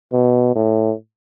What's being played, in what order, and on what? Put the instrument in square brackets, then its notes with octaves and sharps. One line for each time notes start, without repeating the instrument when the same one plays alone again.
[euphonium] B2
A2